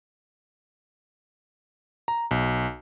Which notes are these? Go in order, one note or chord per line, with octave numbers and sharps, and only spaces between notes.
A#5
B1